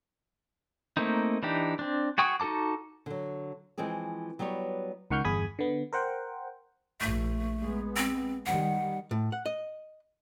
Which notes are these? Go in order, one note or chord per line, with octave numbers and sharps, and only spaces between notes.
A3 A#3 C4 D#4
E3 D4 D#4 G4
C4 D4
F#4 G#4 G5 C#6 D#6
D#4 F#4 A4 A5 D6
D3 F#3
E3 F3 G#3 C4 G#4
F#3 G3 B3 B4 C#5
C#2 D#3 F#5 C#6 F6 G6
G1 E2 G#4 B5 D#6 G#6
D3 B3
A#4 C5 F#5 G5
A#1 A3
G#3 B3
C4
D#3 G3 F#5
A2
F#5
D#5